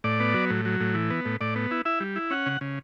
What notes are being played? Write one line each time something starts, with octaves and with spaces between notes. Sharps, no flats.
A2 D5
B3
F#3
A2
F#3
A2
E3
B3
A2
A2 D5
B3
E4
E4 E5
G3
E4
C#4 F#5
C#3
C#3